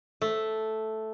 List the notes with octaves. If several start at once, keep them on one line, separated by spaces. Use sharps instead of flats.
A3